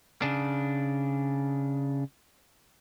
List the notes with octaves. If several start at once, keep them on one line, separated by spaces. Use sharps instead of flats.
C#3 D4